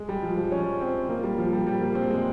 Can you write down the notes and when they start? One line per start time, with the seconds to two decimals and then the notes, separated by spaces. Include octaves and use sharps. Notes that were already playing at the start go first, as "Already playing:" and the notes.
Already playing: G#3
0.09 G3
0.23 F3
0.37 F3
0.52 C#4
0.81 C4
1.09 A#3
1.24 G3
1.38 F3
1.53 G3
1.67 G3
1.81 A#3
1.95 C4
2.10 G#3